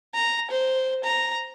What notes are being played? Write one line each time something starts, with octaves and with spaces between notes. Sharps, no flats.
A#5
C5
A#5